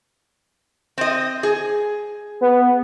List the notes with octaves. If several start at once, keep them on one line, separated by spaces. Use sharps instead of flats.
C4 D#5
G#4
B3